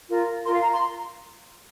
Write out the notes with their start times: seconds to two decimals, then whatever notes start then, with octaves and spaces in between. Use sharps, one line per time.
0.09 F4 A#4
0.44 F4 A#4 C6
0.53 F5
0.63 A#5
0.72 C6